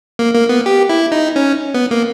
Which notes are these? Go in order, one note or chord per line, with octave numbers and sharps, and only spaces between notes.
A#3
A#3
B3
G4
E4
D#4
C#4
B3
A#3